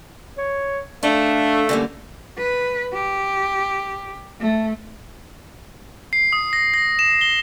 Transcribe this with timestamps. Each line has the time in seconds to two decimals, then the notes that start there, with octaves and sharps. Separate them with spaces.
0.38 C#5
1.03 A3 D4 F5
1.69 D3 G3 A#3 C#4
2.38 B4
2.93 G4
4.40 A3
6.13 C7
6.33 D#6
6.53 A#6
6.74 A#6
6.99 E7
7.21 G7